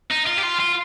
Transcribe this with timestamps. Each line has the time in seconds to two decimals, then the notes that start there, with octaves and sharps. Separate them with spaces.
0.11 D#4
0.27 F4
0.38 G4
0.43 F4
0.60 F4